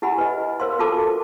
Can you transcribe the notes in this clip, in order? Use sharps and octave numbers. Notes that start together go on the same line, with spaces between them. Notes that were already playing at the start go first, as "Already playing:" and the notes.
E4 G4 F#5 G#5 B5
B4 D#5
A#4 C5 F5 C6
F4 F#4 A4 A5 D6